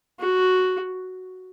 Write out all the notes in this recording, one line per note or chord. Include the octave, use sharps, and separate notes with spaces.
F#4